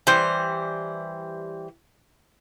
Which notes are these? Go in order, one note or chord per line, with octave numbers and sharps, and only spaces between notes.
E3 G3 C5